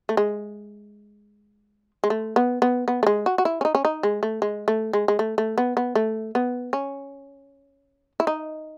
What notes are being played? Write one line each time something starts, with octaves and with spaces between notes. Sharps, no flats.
A3
G#3
G#3
A3
B3
B3
B3
A3
G#3
F#4
F#4
E4
C#4
D#4
C#4
D#4
G#3
A3
G#3
A3
G#3
G#3
A3
A3
B3
B3
A3
B3
C#4
E4
D#4